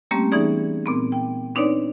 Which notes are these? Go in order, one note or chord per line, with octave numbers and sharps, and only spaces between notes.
G3 A3 A#3 C4 C#4 G4
E3 B3 C#4 D#4 G#4 D5
A#2 B3 C4
G5
C4 D4 D#4 B4 C#5 D5